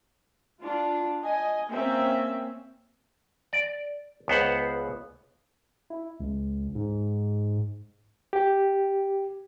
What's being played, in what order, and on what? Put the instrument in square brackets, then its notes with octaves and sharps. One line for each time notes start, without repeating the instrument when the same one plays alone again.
[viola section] D4 F4
D#5 G#5
A#3 C4 C#4 E5
[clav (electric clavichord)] D5
C#2 B3 C5 F#5
[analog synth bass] E4
C#2
G#2
[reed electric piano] G4